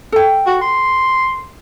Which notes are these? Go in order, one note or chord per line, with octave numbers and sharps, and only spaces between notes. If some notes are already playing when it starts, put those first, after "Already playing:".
A4 G5
F#4
C6